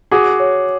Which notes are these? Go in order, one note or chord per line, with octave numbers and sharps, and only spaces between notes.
F#4 G#4 D6
C#5